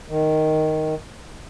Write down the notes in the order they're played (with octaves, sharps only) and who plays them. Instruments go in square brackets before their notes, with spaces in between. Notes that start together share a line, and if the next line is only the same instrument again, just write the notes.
[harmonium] D#3